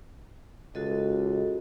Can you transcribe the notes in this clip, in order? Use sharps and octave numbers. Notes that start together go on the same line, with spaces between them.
C#2 F#4 A4 D#5